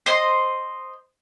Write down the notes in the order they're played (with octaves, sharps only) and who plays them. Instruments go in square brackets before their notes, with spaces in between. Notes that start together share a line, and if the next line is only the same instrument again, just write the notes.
[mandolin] C5 D#5 C6